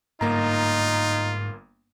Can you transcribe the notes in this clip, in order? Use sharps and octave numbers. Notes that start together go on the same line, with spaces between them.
G1 G#2 A#3 D#4 F4 A#5